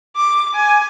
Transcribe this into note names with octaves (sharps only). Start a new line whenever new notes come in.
D6
G#5